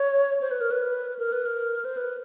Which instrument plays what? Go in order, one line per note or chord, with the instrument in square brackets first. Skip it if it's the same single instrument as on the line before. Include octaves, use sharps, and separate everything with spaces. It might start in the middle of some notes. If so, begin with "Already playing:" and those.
Already playing: [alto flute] C#5
C5
B4
A#4
B4
A#4
B4
A#4
C5
B4